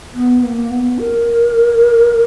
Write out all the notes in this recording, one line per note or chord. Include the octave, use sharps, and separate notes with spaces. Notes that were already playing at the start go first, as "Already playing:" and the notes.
B3
A#3
B3
A#4